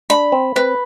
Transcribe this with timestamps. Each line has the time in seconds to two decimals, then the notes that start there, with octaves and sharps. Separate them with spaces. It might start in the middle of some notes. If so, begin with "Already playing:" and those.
0.10 D4 B5
0.32 C4
0.56 C4 B4